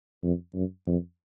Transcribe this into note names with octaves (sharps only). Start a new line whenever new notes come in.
F2
F#2
F2